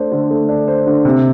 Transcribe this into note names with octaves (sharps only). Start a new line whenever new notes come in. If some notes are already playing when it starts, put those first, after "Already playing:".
Already playing: A3 D4 C5
D3
A3
D4
C5
D3
C3